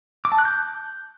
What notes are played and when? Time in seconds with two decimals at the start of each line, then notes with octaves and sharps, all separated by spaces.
0.25 D6
0.32 A5
0.38 F#6
0.45 G6